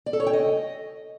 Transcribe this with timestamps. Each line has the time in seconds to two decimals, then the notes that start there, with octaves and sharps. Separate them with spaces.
0.06 D5
0.13 A4
0.20 C#5
0.27 G5
0.33 D#5